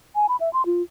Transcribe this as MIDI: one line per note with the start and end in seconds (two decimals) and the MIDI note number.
0.15 0.26 80
0.29 0.36 83
0.40 0.52 76
0.53 0.65 84
0.66 0.82 65